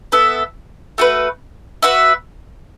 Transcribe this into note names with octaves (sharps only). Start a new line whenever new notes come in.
B3 A4 E5
A3 F#4 B4
F#4 B4 E5